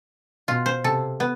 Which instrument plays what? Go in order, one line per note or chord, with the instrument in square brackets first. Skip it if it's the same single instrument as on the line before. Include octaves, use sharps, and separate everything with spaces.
[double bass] B2 [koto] F4
[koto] C5
[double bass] C3 [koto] A4
[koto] B3